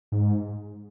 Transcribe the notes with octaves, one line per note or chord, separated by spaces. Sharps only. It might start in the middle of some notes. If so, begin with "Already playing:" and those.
G#2